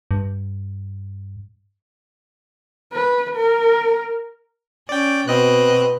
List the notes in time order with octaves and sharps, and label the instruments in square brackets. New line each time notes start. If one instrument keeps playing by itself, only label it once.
[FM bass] G2
[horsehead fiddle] B4
A#4
[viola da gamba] C#4 [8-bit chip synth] D5 G5
[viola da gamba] B2 [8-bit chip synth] C4 D#5 F#6 [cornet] B4